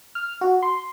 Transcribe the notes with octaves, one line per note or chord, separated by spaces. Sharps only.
F6
F#4
C6